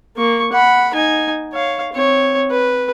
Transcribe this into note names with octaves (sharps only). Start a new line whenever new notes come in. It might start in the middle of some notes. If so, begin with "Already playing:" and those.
A#3 C#6
F#5 B5
D#4 G#5
C#5 F5
C4 C#5
B4